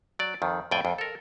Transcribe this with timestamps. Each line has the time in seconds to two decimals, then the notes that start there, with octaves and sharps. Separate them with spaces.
0.19 F#3 D5
0.42 F2 D#3
0.71 F2 A2 D5 G5 G#5
0.85 F2
0.98 A4 A#4